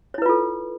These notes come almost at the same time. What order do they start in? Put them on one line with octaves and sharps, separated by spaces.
C#5 E4 B4 F4 A4